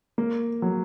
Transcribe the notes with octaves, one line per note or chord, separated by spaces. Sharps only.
A#3
F#3